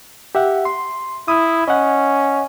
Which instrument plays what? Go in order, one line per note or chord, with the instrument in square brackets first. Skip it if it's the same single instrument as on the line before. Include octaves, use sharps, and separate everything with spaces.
[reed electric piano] G4 E5 F#5
C6
[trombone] E4 [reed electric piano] D#6 E6
[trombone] C#4 [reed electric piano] D#5 F#5